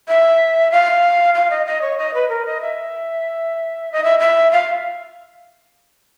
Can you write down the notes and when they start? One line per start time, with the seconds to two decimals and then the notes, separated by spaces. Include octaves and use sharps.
0.08 E5
0.71 F5
1.34 F5
1.50 D#5
1.66 D#5
1.81 C#5
1.98 D#5
2.14 B4
2.29 A#4
2.46 D#5
2.61 E5
3.92 D#5
4.04 E5
4.19 E5
4.51 F5